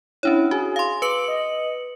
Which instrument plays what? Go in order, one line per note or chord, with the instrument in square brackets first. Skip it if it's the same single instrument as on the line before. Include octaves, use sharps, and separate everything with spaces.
[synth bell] C#4 D4 C#5 [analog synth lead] E4
[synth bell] F#4 [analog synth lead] G#4
[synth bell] F5 C6
[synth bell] B4 C#7 F#7 [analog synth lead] D6
[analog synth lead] D#5